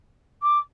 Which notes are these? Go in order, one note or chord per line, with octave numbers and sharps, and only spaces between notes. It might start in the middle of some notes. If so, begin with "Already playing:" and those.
D6